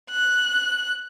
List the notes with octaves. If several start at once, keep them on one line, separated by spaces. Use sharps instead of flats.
F#6